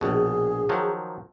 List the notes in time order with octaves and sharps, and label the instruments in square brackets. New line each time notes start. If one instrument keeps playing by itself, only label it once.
[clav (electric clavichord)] A#1 B2 [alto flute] G#4
[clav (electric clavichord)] D#3 F3 F#3